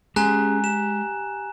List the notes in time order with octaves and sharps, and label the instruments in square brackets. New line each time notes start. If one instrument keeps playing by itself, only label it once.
[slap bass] G#3 [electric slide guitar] C#4 G4 G#4 [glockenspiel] G#5 A#5 F#6
[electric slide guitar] G4 [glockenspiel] E7